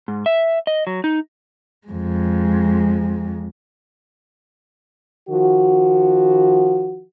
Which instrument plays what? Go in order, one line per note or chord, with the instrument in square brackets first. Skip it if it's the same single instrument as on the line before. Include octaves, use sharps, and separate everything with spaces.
[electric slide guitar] G#2
E5
D#5
F#3
D#4
[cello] F2 G#3
[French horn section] D#3 F3 F#4